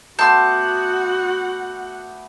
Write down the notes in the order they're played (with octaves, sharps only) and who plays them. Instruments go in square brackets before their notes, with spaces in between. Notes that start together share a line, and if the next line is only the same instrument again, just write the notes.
[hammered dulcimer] A3 B3 [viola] F#4 F#5 [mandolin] A5 C6 [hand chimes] D6 G6